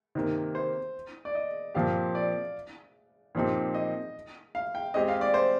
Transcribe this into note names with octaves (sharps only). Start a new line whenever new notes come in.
C3 D#3 A#3
C5
D5
D#5
A#2 F3 C4 G4 F5
D5
A#2 F3 C4 D#4 G4
D#5
F5
G5
G#3 C4 G4 D#5
F5
D5
C5